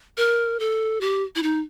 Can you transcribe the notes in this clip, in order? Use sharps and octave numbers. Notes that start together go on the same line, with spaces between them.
A#4
A4
G4
E4
D#4